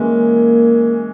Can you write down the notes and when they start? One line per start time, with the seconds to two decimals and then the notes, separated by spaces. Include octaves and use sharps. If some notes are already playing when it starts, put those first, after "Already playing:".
Already playing: E3 G#3 A#3 C#4